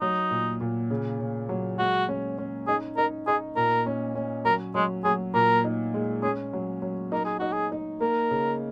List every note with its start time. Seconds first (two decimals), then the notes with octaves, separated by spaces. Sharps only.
0.01 F#3 D#4
0.31 A#2
0.61 A#2
0.90 C#3
1.20 C#3
1.49 F#3
1.78 G#3 F#4
2.09 C#4
2.38 C#4
2.67 D#4 G#4
2.97 D#4 A#4
3.27 D#4 G#4
3.56 A#2 A#4
3.86 C#4
4.15 C#4
4.45 F#3 A#4
4.75 F#3 G#3
5.04 F#3 G#4
5.34 A#2 A#4
5.65 D#4
5.94 G#3
6.23 C#4 G#4
6.53 F#3
6.82 F#3
7.12 D#4 A#4
7.25 G#4
7.39 D#4 F#4
7.53 G#4
7.72 D#4
8.01 A#3 A#4
8.31 C#3